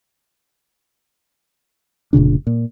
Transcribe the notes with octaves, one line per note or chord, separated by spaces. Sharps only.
F1 A#2 C#3 D4
A#2